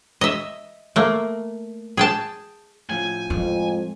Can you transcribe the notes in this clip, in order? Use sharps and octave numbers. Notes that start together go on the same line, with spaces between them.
D#5 E5
A3 A#3
G#4 G5 A5
A2 F3 G#5
F2 G#3